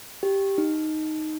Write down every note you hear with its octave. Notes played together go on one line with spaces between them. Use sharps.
G4
D#4